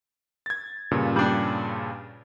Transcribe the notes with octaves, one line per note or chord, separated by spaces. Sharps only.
G#6 A6
G2 A#2 C#3
G3 D4